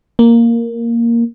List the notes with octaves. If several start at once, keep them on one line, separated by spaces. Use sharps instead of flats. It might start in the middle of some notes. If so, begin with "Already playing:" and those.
A#3